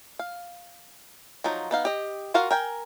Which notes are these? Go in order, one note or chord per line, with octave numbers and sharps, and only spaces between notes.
F5
F3 F#3 D#4
B3 D#4 F5
G4 D#5
F4 F#4 A#4 F5
A#4 G5 G#5